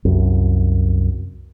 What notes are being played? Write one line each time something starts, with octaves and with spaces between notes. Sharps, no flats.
C2 F#2